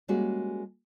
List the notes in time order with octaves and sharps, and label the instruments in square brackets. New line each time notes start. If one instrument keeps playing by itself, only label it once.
[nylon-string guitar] G3 G#3 A#3 C#4 F#4 G#4